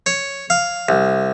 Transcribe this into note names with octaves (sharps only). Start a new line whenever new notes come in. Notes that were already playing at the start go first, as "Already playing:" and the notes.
C#5
F5
C2